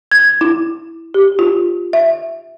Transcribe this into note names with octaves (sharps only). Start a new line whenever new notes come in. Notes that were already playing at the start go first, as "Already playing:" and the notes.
G#6
E4
G4
F4
E5